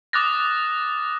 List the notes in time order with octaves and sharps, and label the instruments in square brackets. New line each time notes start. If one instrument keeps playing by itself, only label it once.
[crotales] D6 D#6 F6 F#6 A6 A#6